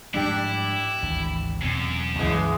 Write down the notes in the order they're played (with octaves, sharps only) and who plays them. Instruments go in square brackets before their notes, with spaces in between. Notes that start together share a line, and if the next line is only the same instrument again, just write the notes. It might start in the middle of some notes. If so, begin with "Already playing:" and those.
[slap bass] G#2 F3 G3 [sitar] D4 G4 [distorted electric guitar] E4
[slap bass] G#1 D2 E3
[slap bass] E1 B2 C4 [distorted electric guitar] F#2
[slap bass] C#2 G2 A#3 [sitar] C#3 E3 G#3